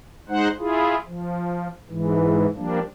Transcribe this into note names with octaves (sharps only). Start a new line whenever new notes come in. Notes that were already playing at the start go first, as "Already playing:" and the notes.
G#3 D#4 C5 F#5
E4 F4 G#4
F3
G#2 E3
F3 G3 A#3 D4